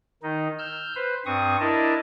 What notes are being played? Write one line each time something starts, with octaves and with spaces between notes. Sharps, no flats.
D#3 D#4
E6 F6 G6
B4 C5
G2 C4 C#6 D#6
D4 E4 A#4 D#5 A5